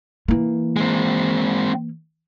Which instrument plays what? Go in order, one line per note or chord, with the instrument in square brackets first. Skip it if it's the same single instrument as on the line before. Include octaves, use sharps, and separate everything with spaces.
[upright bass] E3 A#3
[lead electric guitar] G#3 C4